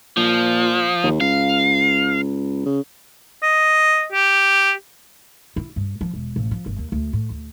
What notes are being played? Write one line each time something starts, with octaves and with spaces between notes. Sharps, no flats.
A#2 F3
D#2
C#2 F5
C#3
D#5
G4
E4
G2
F3
E1
A1
F3
G1
D#2
D2
A2
D2